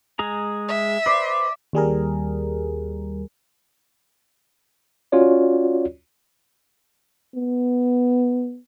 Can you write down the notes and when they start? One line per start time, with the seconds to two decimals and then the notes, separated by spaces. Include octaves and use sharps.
0.19 G#3 G#4 A#5
0.68 E5
1.06 B4 C5 D5
1.73 D#2 G3 G#4 A#4
5.12 C#4 F4 F#4 C#5 D5
7.35 B3